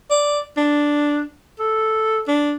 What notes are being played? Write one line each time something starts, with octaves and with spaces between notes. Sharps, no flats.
D5
D4
A4
D4